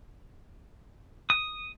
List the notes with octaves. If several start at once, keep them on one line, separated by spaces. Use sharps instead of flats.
D#6